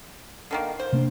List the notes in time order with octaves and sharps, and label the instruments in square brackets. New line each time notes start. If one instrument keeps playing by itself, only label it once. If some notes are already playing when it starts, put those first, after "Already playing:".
[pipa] D3 D#3 A#3
C5
[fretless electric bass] C3 A#3 D4